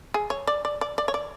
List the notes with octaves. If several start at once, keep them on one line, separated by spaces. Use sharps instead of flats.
G#4
C#5
D5
D5
D5
D5
C#5
D5